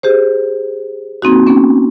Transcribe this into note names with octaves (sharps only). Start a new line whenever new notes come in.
G4 G#4 C5
A#3 C4 D#4 F#4
A#3 B3 C#4